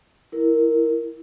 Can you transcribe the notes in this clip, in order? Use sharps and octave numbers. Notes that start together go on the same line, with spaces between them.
E4 A#4